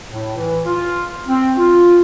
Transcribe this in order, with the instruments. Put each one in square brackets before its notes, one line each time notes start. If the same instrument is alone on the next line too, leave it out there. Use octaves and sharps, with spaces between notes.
[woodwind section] A2
E3
F4
C4
F4